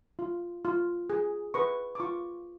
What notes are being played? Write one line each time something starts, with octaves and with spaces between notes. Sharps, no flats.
F4
F4
G#4
B4 C#6
D6
F4 C#6